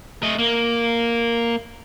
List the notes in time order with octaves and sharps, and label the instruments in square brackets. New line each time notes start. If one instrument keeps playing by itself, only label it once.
[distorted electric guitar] A3 D#5
A#3